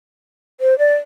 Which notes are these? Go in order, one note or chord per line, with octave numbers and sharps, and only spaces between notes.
C5
D5